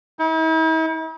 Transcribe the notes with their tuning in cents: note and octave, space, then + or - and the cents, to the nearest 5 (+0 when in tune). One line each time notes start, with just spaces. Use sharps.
E4 -45